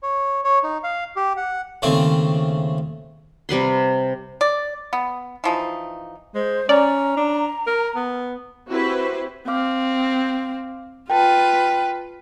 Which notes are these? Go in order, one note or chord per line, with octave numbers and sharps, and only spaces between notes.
C#5
C#5
D#4
F5
G4
F#5
D#2 C#3 A3 C4 C#6
C3 G3 B4 C6
D5
B3
E3 F3 D#4
G#3 C5
C#4 D5 A#5
D4
A#4
B3
C4 E4 F#4 G4 B4 C5
C4 F5 D6 F6
F4 B4 G5 A5